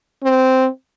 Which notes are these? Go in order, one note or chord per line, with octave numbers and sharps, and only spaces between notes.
C4